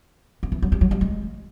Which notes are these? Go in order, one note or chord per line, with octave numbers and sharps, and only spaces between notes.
D#3
E3
F#3
G3
F#3
G3
G#3